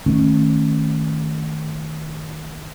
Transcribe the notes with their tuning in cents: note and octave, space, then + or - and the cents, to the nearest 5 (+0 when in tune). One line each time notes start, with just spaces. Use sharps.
D#3 +0 A3 +0 C#4 -15